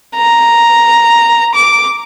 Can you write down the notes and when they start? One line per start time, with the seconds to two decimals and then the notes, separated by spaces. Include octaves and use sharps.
0.17 A#5
1.55 D6